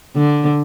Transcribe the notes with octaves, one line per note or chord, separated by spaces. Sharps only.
D3